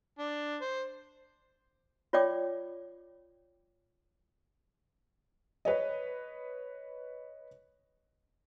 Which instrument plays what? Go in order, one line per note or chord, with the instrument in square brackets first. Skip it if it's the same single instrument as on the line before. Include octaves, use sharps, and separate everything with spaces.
[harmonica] D4
C5
[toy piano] F4 C#5 D5 G5 D6
[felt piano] B4 C#5 D#5